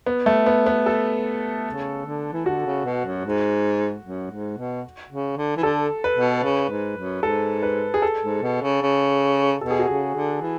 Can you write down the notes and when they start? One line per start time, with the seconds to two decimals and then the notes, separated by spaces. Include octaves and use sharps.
0.06 B3
0.26 A3
0.46 B3
0.66 B3
0.86 A4
1.66 C#3
2.06 D3
2.33 E3
2.46 D3 F#4
2.66 C#3
2.85 B2
3.05 F#2
3.25 G#2
4.05 F#2
4.31 G#2
4.58 B2
5.10 C#3
5.37 D3
5.57 E3
5.63 D3 A4
6.04 B4
6.17 B2
6.43 C#3
6.70 G#2
6.97 F#2
7.23 G#2 A4
7.63 B4
7.94 G#4
8.02 A4
8.22 G#2
8.42 B2
8.62 C#3
8.82 C#3
9.61 B2 A4
9.71 G#4
9.79 F#4
9.87 C#3 G#4
10.15 D3
10.41 E3